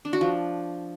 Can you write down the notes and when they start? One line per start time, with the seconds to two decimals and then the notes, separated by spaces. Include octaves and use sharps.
0.05 D4
0.13 F#4
0.21 F3